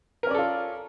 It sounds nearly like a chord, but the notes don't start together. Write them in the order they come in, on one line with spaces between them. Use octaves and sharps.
A#4 C#4 D5 A4 F4